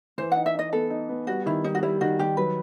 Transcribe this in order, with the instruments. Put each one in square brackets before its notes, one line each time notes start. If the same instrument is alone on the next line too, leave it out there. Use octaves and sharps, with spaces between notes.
[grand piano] E3 [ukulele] C5
[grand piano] D#4 [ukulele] F#5
[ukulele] E5
[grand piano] D#4 [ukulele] D#5
[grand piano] B3 [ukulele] A4
[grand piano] D#4
B3
[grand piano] G3 [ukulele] F#4
[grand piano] D#3 [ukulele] E4
[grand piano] G3 [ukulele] D#4
[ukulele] F#4
[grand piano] G3 [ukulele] E4
[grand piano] D#3 [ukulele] F#4
[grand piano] D#3 [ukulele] G4
[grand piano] F#3 [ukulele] B4